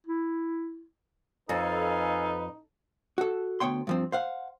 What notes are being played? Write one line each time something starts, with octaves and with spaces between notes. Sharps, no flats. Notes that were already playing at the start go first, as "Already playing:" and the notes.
E4
F2 D#4 A4 B4 F5 G#5
F#4 A4
D2 B3 C#5 G5 C6
G2 F3 C4
C5 F5 F#5